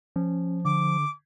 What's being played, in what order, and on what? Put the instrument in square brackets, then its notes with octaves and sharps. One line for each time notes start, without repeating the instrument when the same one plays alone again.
[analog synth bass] F3 [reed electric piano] C#4
[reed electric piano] D3 [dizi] D6